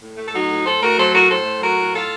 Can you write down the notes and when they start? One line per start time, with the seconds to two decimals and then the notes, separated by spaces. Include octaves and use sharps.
0.01 A2
0.16 A3
0.25 A4
0.33 F#3 D#4 F#4
0.49 A2
0.64 A2 A4 C5
0.80 A3 F#4 A#4
0.97 F#3 A4 C5
1.13 A2 F#4 A#4
1.29 A2 A4 C5
1.45 A3
1.61 F#3 F#4 A#4
1.78 A2
1.93 A2 F4 A4